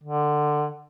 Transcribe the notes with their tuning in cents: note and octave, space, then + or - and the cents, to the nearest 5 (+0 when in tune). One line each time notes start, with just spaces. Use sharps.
D3 +20